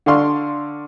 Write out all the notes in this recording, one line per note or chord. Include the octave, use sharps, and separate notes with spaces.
D3 A4 D5 F5 C6 C#6